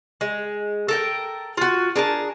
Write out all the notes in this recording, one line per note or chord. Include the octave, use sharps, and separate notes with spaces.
G#3
A4 A#4 G5
F4 F#4
D4 G#4 A#4 A5